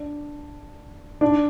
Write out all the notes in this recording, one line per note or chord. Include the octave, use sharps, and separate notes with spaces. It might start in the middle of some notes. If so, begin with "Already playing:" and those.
Already playing: D4
D4